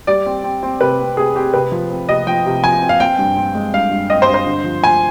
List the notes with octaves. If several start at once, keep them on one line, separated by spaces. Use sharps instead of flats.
G3 D5
C4
C4
C4
C3 B4
C4
C3 G#4
C4 G4
C3 B4
F3
C4
C3 D#5
F3 G5
C3
F3 G#5
C4
F5
C4 G5
G2
C4
G#3
G2 F5
G2
C4 D#5
C5
G2
C5
D3
F3
F3 G#5